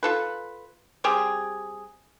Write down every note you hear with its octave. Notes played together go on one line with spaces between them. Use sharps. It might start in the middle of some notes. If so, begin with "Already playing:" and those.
F4 A4 B4
G3 C4 G4 G#4